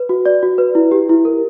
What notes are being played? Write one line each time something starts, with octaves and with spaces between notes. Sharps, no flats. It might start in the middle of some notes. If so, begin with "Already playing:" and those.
Already playing: B4
F#4
D5
F#4
B4
E4
G4
E4
A#4